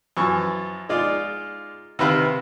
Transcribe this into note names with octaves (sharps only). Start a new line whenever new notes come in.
F#2 E3 F3 C#6
G#3 D#4 F4 D5
C3 D#3 B4 E5 F5